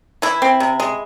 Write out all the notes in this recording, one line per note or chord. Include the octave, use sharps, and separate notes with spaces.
E3 E4
C4
C3
G#3